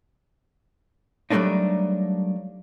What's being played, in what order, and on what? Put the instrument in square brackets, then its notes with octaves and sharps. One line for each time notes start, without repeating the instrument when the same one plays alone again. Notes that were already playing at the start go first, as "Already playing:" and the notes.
[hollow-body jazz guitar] F#3 G3 A3 A#3 D4 D#4